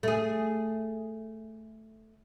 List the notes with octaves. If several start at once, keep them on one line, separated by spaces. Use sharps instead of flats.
A3 G#4